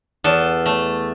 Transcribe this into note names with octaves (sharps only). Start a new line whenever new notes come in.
E2 A4
A3